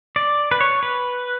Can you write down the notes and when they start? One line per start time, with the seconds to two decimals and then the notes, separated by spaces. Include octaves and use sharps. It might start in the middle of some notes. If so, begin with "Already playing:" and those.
0.16 D5
0.51 B4
0.61 C#5
0.83 B4